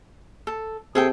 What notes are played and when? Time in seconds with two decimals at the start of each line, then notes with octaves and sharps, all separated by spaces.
0.47 A4
0.95 C3 G#4 A4 G5